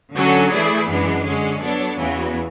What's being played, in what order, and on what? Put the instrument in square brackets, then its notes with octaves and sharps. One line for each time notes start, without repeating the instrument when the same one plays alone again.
[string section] D3 F#3 C#4 F#4 A4
E3 A3 E4 G#4 D5
F#2 E3 G#3 B3 D4
D3 G#3 C#4 G#4
F#3 B3 D4 A4 C#5
E2 C#3 E3 B3 F#4